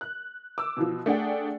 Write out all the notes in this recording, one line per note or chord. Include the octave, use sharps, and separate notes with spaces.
F#6
D6 E6
B2 E3 F3
A3 D4 G#4 F#5 G5